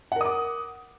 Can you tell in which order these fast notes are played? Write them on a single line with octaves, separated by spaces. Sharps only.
F#5 A#4 D#6 D6